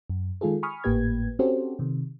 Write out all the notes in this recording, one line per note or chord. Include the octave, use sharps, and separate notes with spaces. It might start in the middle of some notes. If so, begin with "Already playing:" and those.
F#2
D#3 G#3 F4 G#4 A4
G#5 B5 C#6 D#6 F6
G#1 A2 A#3 G4 B4 G#6
C4 C#4 F#4 G4 A4 C5
C3 D#3